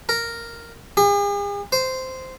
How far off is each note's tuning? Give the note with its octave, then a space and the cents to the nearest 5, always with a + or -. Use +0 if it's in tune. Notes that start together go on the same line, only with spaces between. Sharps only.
A#4 -5
G#4 -45
C5 -10